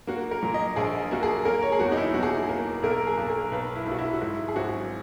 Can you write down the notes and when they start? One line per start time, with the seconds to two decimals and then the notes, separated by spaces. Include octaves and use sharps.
0.07 A#3 F#4
0.31 A#4
0.43 A#2
0.54 D#5
0.76 A#1 G#4
1.11 A#3 F#4
1.23 G#4
1.45 A#3 A#4
1.62 C#5
1.72 G#4
1.80 E2 F#4
1.92 D#4
1.97 E4
2.14 B2 F#4
2.23 G#4
2.31 F#4
2.49 A#3
2.83 B1 A#4
3.07 G#4
3.18 B1
3.30 A#4
3.52 B1 B4
3.75 E4
3.86 B1 F#4
3.99 E4
4.13 F#4
4.21 G#2 E4
4.48 G#4
4.56 G#1 F#4